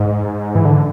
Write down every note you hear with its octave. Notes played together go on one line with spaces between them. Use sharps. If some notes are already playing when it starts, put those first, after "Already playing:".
Already playing: G#2
E3
D3